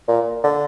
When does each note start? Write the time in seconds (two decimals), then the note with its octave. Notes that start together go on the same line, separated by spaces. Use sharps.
0.08 A#2
0.44 D3